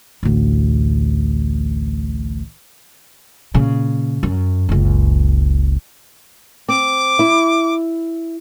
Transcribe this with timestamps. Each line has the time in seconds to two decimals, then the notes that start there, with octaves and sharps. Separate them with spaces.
0.23 A1 D2
3.54 A#2 C#3
4.23 F#2
4.69 F#1 C#2
6.69 C4 D6
7.19 E4